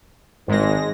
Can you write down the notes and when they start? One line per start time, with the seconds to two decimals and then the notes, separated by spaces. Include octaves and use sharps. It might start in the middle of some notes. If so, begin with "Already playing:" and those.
0.48 G#1 G#2 G#3 A#6